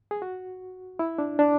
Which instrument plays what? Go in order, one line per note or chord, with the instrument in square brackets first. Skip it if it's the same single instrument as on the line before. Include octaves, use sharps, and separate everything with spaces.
[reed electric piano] G#4
F#4
E4
D4
D4